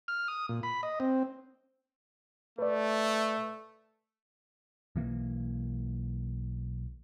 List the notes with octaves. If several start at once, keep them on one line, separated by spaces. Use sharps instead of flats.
F6
D#6
A#2
B5
D#5
C4
A3 B4 D5
B1 E3 A#3